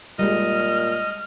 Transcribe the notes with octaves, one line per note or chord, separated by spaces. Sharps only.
A#2 G3 G#3 D#5 F6